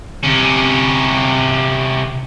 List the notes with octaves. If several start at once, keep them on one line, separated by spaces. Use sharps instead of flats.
C3 C#4